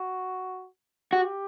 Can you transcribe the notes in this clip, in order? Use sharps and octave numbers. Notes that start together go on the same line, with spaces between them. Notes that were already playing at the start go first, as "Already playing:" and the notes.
Already playing: F#4
F#4 G4